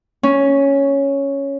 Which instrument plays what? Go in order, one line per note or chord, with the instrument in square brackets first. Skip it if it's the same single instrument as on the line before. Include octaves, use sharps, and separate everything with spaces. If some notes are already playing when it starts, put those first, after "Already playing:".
[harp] C#4